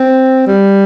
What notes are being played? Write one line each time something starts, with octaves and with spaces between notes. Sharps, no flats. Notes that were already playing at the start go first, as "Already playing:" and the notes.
Already playing: C4
G3